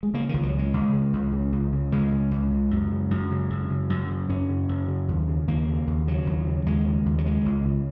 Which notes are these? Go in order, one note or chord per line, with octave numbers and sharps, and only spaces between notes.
G#3
C#3 A#3
C#2 D#3
F#3
C#3 G#3
C#2
C#3
C#2
C#3
C#2
C#3
C#2 G#3
C#3
C#2
C#3
F#2
C#3
F#2
C#3
F#2
C#3
F#2
C#3
F#2 C#4
C#3
F#2
C#3
D#2
C#3
D#2 A#3
C#3
D#2
C#3 F#3
D#2
C#3
D#2 G#3
C#3
D#2
F#3
C#3 G#3
C#2
C#3